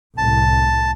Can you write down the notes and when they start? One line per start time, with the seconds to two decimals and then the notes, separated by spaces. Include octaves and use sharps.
0.18 C2 A2 A5